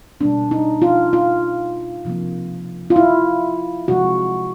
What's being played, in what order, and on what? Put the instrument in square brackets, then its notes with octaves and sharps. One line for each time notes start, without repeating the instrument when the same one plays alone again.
[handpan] B2 G3 A#3 D4
D#4
F4
F4
C3 F3 A#3
F4
E4
C3 F3 G#3 F#4